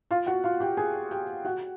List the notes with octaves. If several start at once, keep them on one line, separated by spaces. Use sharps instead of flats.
F4 F5
F#4 F#5
F4 F5
G4 G5
G#4 G#5
G4 G5
F#4 F#5